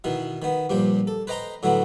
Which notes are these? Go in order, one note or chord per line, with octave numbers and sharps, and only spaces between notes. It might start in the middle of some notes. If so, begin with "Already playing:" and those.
B2 D#3 E3
D#3 B3
G2 A#2 F3 G5
A4
B4 C5 D#5 G5 A#5 C6
A2 D3 F#3 B3